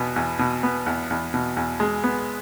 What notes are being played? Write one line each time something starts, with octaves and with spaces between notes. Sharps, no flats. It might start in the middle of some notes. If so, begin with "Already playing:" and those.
Already playing: E2 B2 B3
E2
B2
B3
E2
E2
B2
E2
G#3
B3